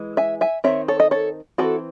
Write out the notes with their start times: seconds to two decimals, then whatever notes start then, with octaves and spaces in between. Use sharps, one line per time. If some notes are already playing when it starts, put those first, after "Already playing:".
Already playing: E3 G#3
0.17 E5 G#5
0.41 E5 G#5
0.64 D#3 F#3 C4 C#5 E5
0.88 A4 C#5
1.00 D#5
1.11 A4 C#5
1.58 E3 C4 E4 F#4 A4